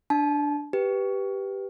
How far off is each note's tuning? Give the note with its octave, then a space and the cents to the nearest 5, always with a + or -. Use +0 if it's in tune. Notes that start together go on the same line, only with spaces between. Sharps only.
D4 +0 A5 -30
G4 +0 B4 +0